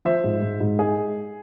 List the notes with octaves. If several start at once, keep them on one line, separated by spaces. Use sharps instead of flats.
F3 C5 E5
G#2
G#2
G#2
G#3 G#4